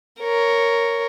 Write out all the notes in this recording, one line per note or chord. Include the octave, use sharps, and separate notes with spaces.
A#4 C#5